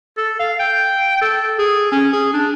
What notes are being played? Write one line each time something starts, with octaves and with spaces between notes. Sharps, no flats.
A4
F5
G5
A4
G#4
C#4
G#4
D4